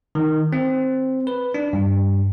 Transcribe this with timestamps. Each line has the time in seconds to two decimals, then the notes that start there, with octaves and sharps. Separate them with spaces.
0.15 D#3
0.53 C4
1.27 B4
1.54 D4
1.73 G2